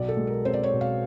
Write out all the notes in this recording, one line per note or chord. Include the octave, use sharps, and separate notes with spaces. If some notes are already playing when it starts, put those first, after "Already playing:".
Already playing: B1 D5
A4
G#3
A#4
C4 C5
D5
C#5
B2
F5